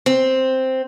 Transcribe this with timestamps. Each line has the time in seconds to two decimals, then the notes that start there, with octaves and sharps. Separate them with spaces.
0.06 C4